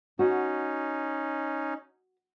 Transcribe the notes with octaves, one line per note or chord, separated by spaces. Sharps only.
C#4 D#4 F#4